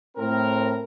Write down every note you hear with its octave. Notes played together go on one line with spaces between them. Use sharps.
A2 C4 A#4